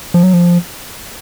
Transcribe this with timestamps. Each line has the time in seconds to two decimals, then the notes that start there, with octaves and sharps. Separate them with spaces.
0.14 F3
0.23 F#3
0.33 F3